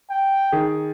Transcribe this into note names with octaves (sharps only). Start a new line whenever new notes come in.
G5
D#3 G#4